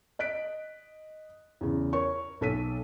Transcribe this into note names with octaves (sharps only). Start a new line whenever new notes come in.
D#5 F#6 B6 D7
E2 C#3
A#4 C#5 C#6
B1 A4 B6 D#7